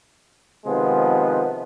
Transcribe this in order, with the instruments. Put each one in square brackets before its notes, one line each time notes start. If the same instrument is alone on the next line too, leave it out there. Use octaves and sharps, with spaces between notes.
[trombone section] C3 D#3 F3 G#3 B3